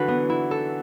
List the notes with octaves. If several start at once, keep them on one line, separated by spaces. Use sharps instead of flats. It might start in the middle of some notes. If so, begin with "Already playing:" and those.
Already playing: D3 E3 F#3 F#4 B4
B3
E4
A4